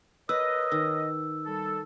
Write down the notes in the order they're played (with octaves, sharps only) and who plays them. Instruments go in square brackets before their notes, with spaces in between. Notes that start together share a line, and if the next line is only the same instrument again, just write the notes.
[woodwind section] A#4 C#5 D#5 [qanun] B4 [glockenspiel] E6
[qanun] D#3 [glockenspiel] E6
[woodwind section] G3 A4